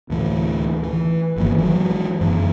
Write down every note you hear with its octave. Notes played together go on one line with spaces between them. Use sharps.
D2 A2 E3
E3
G1 D#3 F3 A#3
E3 F#3
F#2 E3